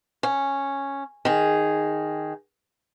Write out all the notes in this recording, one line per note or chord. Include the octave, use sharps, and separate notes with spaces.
C#4
D#3 G#4